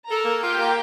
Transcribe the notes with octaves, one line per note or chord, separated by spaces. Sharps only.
A4 A#4 A#5
A#3
F4 G4 G5
A#3